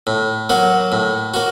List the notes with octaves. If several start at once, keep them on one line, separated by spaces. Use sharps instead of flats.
A2
F#3 A#3 F#4
A2
A#3 F#4